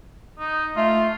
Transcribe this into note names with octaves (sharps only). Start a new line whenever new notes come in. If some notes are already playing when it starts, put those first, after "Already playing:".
D#4
A3 F4